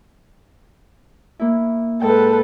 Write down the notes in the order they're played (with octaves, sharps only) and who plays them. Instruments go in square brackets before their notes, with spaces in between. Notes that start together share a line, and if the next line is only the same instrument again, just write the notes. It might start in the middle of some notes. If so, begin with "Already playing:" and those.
[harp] A#3 E4
[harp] G#2 G5 [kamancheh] A4 B4